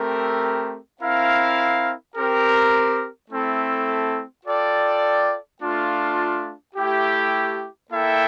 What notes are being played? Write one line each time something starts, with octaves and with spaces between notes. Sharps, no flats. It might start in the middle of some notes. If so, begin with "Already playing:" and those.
Already playing: A3 C4 G4 A#4
C4 E4 A#4 F5
C4 G4 A#4
A3 C4 E4 A4
F4 A4 D5 G5
A3 D4 F4
A3 E4 G4
A#3 E4 A4 E5 G5